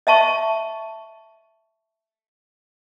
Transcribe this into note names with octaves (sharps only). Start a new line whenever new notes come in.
D#5 E5 A5 C#6